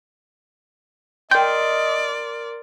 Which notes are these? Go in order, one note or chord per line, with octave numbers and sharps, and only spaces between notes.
A#4 D5 D#5 G5 C6